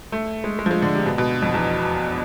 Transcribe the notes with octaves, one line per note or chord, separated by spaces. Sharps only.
A3
G#3
G#3
F3
G#3
D3
C3
B2
B2
F2
E2